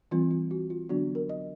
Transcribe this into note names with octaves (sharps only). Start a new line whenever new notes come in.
E3 G3 C4 F4
F4
F#4
F4
D3 F#3 B3 D4 F#4
A#4
D#5